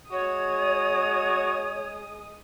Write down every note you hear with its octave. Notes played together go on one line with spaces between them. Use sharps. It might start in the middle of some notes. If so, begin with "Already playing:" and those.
G#3 F#4 C#5 D#6